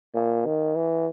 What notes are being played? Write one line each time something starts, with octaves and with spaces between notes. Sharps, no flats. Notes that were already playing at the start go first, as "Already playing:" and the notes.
A#2
D#3
E3